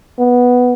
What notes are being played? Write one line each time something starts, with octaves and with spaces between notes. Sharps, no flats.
B3